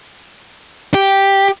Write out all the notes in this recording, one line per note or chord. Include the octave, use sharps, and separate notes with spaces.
G4